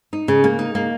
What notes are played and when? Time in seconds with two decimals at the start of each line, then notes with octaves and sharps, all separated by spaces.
0.13 D#4
0.28 C#3
0.44 A#3
0.59 D#4
0.75 A#3